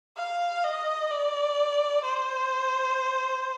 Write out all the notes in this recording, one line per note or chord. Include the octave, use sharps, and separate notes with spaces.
F5
D#5
D5
C5